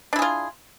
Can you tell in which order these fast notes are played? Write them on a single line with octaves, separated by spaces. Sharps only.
D4 E4 G#4 F4